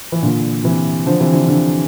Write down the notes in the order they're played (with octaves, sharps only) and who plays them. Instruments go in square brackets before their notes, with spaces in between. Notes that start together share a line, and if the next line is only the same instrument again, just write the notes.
[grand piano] E3
A#2 D3
C3 E3
D3 F3
C3 E3
D3 F3
D3 F3